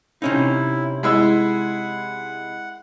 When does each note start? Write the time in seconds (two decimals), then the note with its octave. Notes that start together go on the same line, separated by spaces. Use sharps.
0.22 C3 C#4 D#4 E4
1.03 G#3 E4 F#5 E6